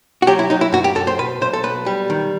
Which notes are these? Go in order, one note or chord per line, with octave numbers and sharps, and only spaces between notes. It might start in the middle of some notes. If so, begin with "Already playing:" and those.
F#4
F#3 G4
E4
F#3 D#4
E4
F#2 F#4
G4
F#2 A4
C5
B2 B4
B1 C5
A4
B1 B4
G3
D#3